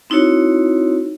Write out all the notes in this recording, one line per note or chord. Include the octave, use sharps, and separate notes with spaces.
C4 D#4 E4 F#4 C#5